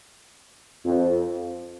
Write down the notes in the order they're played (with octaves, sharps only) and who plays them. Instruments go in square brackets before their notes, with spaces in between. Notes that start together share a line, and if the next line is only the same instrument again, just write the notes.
[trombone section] F2